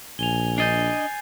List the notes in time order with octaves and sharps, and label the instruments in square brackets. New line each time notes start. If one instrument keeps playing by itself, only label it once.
[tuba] A#1 [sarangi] G#5 [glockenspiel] F7 G7
[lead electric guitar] D4 D#5 [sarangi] G#5 [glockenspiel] G6 A6 C7